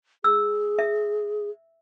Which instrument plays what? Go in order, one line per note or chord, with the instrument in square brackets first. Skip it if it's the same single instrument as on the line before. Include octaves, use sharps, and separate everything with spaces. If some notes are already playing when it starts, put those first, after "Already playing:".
[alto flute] G#4 [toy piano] E6
[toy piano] E5